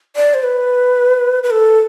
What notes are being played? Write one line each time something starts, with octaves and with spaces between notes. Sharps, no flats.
D5
C5
B4
B4
A4